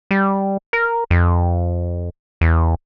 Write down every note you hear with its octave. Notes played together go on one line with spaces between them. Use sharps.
G3
A#4
F2
E2